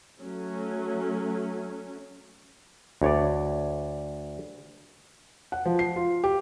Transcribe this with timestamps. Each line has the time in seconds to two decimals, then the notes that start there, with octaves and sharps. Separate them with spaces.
0.21 F#3 A3 C#4
3.02 D2 C#5 D5
5.52 F#5
5.65 F3
5.79 C7
5.96 F4
6.24 G4